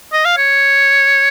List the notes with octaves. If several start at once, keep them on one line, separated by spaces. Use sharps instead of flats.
D#5
F5
C#5